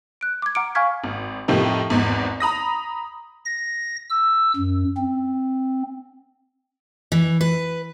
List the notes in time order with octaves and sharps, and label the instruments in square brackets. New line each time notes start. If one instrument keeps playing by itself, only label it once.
[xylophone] F#6 D7
D6 G#6
F#5 A#5 D6 F6 C#7 D7
F5 G#5 C#6 F6 G#6 B6
[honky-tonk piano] G#1
F2 A2 F3 D#4 G4 A#4
G#1 E2 G#2
A#5 B5 D#6 A#6
[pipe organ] A#6
E6
F#2
C4
[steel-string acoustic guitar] E3
B4